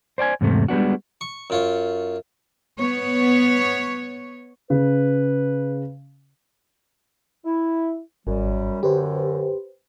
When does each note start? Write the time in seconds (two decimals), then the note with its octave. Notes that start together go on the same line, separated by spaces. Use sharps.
0.18 C5 D5 G5 G#5
0.41 E2 G#2 C3 A3
0.69 G3 G#3 B3 D4 F#4
1.21 C#6
1.50 F#2 F4 C#5
2.78 B3 C#5
4.70 C#3 B4
7.45 E4
8.27 G#1 F#2 G3
8.83 F#2 D3 G4 B4 C5